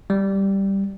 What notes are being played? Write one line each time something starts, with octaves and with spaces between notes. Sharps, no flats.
G3